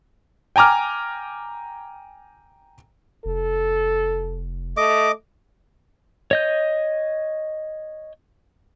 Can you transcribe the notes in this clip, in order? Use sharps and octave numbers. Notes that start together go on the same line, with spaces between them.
G5 G#5 A#5 D6 F6
F1 A4
A3 D#5 D6
C#5 D#5 G6